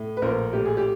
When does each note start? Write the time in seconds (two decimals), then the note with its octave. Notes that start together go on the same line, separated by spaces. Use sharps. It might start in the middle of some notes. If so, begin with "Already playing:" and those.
Already playing: A2
0.17 B4
0.22 A#1 A#4 C5
0.53 A2 G4
0.65 G#4
0.77 G4